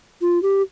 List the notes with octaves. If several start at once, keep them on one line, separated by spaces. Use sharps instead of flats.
F4
G4